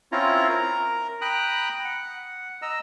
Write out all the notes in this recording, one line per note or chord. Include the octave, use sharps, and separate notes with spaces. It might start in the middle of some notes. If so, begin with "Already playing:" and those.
C4 C#4 E4 F4 A#5
A#4 A#5
G5 A#5 B5 D#6 F#6
F#5
D#5 A#5 E6